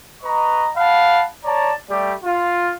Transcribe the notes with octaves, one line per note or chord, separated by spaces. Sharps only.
B4 D#5 A#5 C#6
F5 F#5 A5 B5
C#5 D5 A5 A#5
G3 A3 G4 D5
F4